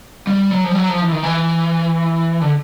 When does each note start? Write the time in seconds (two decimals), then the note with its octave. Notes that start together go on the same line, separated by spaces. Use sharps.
0.27 G3
0.52 F#3
0.64 F3
0.71 G3
0.76 F#3
0.89 F3
1.02 E3
1.12 D#3
1.23 E3
2.41 D3